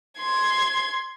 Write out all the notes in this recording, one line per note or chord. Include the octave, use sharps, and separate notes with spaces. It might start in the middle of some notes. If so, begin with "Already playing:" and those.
C6 G#6